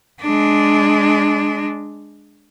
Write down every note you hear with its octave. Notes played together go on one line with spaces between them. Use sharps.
G#3 D4